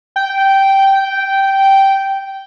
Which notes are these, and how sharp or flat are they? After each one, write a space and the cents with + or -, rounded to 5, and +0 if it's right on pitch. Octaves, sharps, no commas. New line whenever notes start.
G5 -10